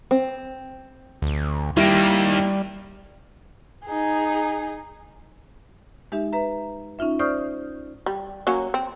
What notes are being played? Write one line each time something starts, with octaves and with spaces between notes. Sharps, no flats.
C4
D2
D#3 G3 A#3 E4 G4 D7
D#4 G#4
G#3 D#4 G4 E5
B4 E5 A#5
C#4 D#4 F4 E5
C5 D5 C#6 D#6 F6 G6
G3
F#3 A#3 C#4
C4